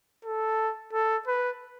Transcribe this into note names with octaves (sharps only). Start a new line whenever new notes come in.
A4
A4
B4